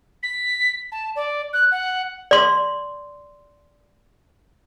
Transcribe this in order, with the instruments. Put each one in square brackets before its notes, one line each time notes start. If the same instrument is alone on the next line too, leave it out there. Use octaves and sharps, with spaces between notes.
[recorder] B6
A5
D5
F#6
F#5
[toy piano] D5 C6